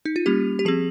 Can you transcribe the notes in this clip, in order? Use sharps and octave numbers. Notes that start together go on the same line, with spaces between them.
D#4
F4
G3 A#3 C#4 G4
G4
F3 C4 G#4